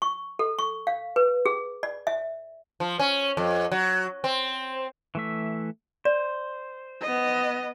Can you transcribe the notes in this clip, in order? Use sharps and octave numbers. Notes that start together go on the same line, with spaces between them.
C#6
A4
C#6
F5
B4
G#4
D5
E5
F3
C#4
F2
F#3
C4
E3 A3 E5
C5 D5
B3 D#5